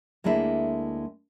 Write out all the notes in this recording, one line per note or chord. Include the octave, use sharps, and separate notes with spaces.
D2 G#3 A#3 D4 E4